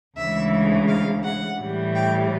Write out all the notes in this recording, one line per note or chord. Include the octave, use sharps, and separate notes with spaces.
D2 C#3 E3 G#3 E5
F5
F#5
A2 E3 G3
G5